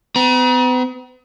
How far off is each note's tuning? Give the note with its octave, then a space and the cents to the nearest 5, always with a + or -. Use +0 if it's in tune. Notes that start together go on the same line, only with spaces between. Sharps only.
B3 +45 A#5 +45